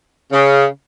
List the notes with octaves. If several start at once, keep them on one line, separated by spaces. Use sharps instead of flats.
C#3